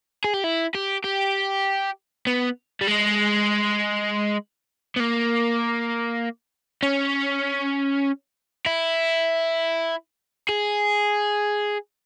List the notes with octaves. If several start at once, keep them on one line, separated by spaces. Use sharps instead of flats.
G#4
G4
E4
G4
G4
B3
G3
G#3
B3
A#3
C#4
E4
G#4